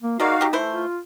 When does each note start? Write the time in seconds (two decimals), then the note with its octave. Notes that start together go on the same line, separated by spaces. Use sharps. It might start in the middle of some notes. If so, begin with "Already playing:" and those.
0.03 A#3
0.20 G#3 A#3 D#4 F#4 D5 F5
0.41 F#3 G4
0.53 E3 A3 E4 C5
0.72 F4